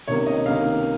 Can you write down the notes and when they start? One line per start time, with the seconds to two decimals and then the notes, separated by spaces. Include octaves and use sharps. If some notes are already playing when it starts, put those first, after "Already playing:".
0.08 C#2 C3 D#3 A#3 C#5
0.26 D#5
0.46 C#2 C3 D#3 A#3 F5